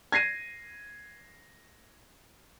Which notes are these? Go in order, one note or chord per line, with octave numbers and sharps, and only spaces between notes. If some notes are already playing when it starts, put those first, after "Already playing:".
G#6 A#6 C7 D#7